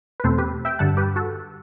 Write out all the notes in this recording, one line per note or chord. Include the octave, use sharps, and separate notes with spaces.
B4
E2 B2 A3 C4 A4 C5
G4 B4
E5 G5
G2 D3 G3 F#5 A5
G4 B4
F#4 A4